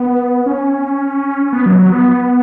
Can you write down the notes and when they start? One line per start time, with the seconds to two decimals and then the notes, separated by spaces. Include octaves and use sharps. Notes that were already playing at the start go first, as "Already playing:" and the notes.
Already playing: B3
0.46 C#4
1.53 B3
1.66 F#3
1.79 F#3
1.92 B3